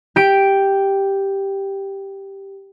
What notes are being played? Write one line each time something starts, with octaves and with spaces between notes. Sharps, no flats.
G4 D7